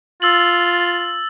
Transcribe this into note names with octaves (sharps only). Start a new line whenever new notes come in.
F4 E6 A6 F#7